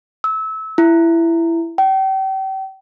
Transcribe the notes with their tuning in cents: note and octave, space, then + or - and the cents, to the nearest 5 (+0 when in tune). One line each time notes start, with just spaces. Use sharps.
E6 -25
E4 +15
G5 -35